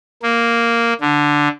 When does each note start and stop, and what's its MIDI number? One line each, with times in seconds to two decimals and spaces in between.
0.23 0.93 58
1.01 1.48 50